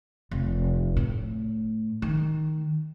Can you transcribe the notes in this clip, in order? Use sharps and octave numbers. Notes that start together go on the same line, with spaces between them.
F1
A2
D#3